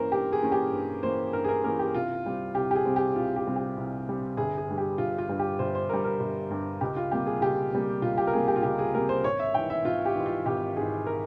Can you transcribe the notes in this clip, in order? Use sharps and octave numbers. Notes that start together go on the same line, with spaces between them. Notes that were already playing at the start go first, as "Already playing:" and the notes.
Already playing: G2 E3 A#3 C#4 A#4 C5
G2 G4
G#4
E3 A#3 C#4
G4
G2
E3 A#3 C#4 C5
G2 A#4
G#4
A#4
E3 A#3 C#4 A#4
G4
C2 F4
C3 G3 C4
C2 G4
G4
G#4
C3 G3 C4
G4
C2 F4
G4
C3 G3 C4
G4
C2
C3 G3 C4
G1 G#4
G#4
G2 G3
G4
G1 F4
F4
G2 G3
G4
G1 C5
C5
G2 G3 A#4
A#4
G1
G2 G3
C#2 G4
F4
C3 G3 A#3 G4
G#4
C#2 G4
C3 G3 A#3
C#2 F4
G4
A#4
C3 G3 A#3 G#4
G4
F4
C#2 G4
G#4
C3 G3 A#3 A#4
C5
G#1 C#5
E5
G#2 E3 G5
E5
G#1 F4
G4
G#2 E3
F4
G#1 G4
G#2 E3 G#4
A#4